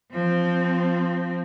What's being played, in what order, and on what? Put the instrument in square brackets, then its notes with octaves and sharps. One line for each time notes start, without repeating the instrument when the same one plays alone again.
[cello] F3 C4